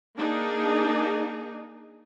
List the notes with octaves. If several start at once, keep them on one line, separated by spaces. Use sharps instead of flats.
A#3 D4 D#4 G#4